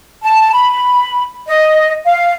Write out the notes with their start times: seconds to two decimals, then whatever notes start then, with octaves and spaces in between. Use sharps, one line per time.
0.24 A5
0.53 B5
1.48 D#5
2.06 F5